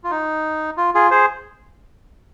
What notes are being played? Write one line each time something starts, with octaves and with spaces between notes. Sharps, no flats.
F4
D#4
F4
F4 G#4
G#4 C5